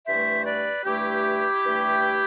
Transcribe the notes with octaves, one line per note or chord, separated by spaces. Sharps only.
G2 E3 A3 C5 E5
B4 D5
G2 E3 A3 E4 G4
G2 E3 A3